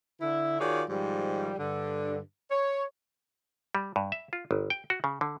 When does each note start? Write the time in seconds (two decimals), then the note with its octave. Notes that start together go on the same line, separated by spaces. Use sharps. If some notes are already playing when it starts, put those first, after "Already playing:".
0.21 D3 E4
0.59 D#3 F4 F#4 G#4 C#5 D5
0.89 G#2 D#3 F3 G3
1.59 G2 D3
2.51 C#5
3.75 G3
3.96 G2
4.12 E5
4.33 F4
4.51 G1
4.70 G5
4.90 F#4
5.04 C#3
5.21 D3